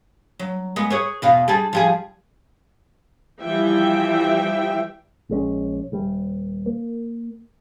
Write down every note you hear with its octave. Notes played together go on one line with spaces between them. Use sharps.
F#3
G#3 B3
G#4 B4 C#5
E2 B2 F5
G3 G#4 A4
F3 G3 G#4
E3 F3 G3 E5 G5
A#1 G#3 C#4
D#1 G3
A#3